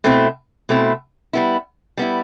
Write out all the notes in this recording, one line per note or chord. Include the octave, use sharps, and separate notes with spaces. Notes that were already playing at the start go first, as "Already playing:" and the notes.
B2 A3 C4 E4
B2 A3 C4 E4
G3 B3 E4
G3 B3 E4